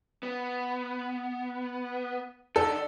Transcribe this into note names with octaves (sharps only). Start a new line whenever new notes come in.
B3
D3 D#3 A4 D5